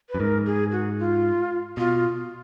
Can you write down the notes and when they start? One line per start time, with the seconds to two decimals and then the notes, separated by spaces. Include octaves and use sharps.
0.09 B4
0.14 F#2
0.19 G#2 A#4
0.46 G#4
0.72 F#4
0.99 F4
1.77 B2 F4